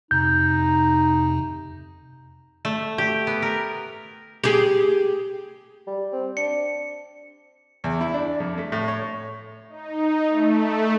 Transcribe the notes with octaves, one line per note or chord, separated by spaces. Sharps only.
F2 C3 D#4 G6
A3
G4
B3
A#4
G4 G#4
G3
C4
D4 C#7
E2
E4
D4
F2
A3
A2
C#5
D#4
A3